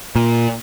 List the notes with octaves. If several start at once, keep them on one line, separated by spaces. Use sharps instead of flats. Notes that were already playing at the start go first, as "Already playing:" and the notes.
A#2